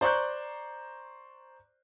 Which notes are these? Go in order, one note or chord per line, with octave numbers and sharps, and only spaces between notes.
C5 D5 A#5 C#6 F#6 G6